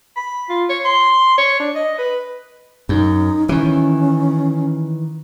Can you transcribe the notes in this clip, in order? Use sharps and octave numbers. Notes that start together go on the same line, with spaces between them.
B5
F4
C#5
C6
C#5
D4
D#5
B4
F#2 D#4
D#3 E3 C#4